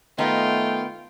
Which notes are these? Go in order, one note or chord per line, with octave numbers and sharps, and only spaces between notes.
D#3 A3 B3 F4 D#5 G5